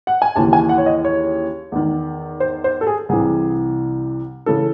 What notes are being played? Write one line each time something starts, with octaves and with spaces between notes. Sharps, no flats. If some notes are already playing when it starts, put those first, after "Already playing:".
F#5
G#5
D#2 C#3 E3 A5
G#5
F#5
C#5
D#5
C#5
E2 D#3
C5
C5
A4
G#4
C2 C3 E3 G#4
C#3 E3 A4